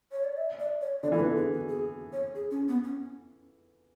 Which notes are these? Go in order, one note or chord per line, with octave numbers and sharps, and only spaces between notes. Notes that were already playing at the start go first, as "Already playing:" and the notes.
C#5
D5
E5
D5
C#5
D3 D5
E3 A4
D3 B4
G#4
F#4
G#4
C#5
G#4
C#4
B3
C#4